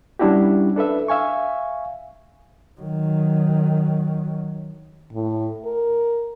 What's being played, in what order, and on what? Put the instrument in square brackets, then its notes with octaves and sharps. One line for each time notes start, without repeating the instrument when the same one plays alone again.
[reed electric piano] G3 C#4 D4 E4 F#4 G4
D4 A4 B4 E5
E5 F5 G#5 C#6
[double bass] D#3 F#3
[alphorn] A2
A#4